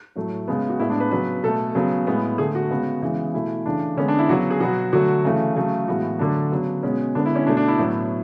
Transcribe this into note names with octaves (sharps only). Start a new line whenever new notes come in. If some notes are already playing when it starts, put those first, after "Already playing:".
A2 F#3 A3
C#3 G#3 B3
F#4
A2 G#3 B3 E4
D4
B4
C#3 F#3 B3 B4
B2 A3 A4
C#3 F#3 B3
A2 G#3 B3
D3 A3 G#4
F#4
C#3 G#3 B3
C#3 E3 G#3 B3
B2 A3 E4
C#3 E3 A3 D4
D3 G#3 B3 C#4
D4
E4
C#3 F#3 B3 F#4
G#4
B2 F#3 B3 F#4
D3 F#3 A3 F#4
C#3 E3 A3
C#3 F#3 A3
A2 E3 G#3 B3 F#4
D3 F#3 A3 D4
C#3 F#3 B3
B2 G#3 B3 C#4
D3 G#3 B3 D4
E4
C#4
B2 A3 D4
D4
E4
A2 F#3 B3